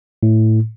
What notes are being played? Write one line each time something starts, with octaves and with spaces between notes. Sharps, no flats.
A2